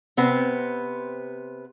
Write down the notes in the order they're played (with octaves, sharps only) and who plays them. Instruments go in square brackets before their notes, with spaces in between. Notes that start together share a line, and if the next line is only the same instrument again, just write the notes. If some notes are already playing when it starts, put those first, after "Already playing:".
[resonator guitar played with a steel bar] C3 B3 C4 C5